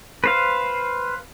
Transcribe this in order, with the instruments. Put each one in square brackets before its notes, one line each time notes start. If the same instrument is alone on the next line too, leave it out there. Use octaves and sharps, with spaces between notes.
[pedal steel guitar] B4 C5 F5